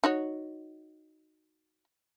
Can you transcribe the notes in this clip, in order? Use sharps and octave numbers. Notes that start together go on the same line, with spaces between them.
D#4 F#4 C#5